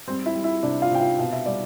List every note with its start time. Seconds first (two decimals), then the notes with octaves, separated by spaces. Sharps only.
0.08 G3 C4 C5
0.26 E4 E5
0.35 G3
0.44 E4 E5
0.63 C3 D4 D5
0.82 F4 F5
0.91 C3 G5
1.00 F4 F5
1.19 B2 F5
1.33 E5
1.46 G3 D5